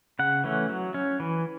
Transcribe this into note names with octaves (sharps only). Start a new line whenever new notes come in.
C#3 F#5
E3 A3 C#4
F#3
C#4
E3